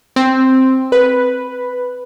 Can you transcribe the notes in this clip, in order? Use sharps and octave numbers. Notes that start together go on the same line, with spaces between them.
C4
B4